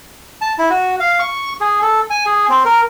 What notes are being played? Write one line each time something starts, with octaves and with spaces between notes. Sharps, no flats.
A5
E4
F#4
F5
C#6
G#4
A4
G#5
G#4
C4
A#4